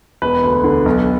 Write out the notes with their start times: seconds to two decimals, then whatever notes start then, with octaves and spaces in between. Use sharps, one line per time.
0.22 E1 B4
0.44 D2
0.64 D3
0.86 B1